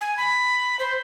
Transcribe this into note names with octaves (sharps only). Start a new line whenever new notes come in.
G#5
B5
C5